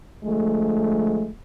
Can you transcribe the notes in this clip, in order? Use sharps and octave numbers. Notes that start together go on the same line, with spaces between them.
D3 F3 G#3 A3